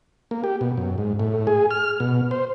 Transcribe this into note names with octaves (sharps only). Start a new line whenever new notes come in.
A#3
G4
B2
F#2
G#2
A2
G#4
F6
B2
C5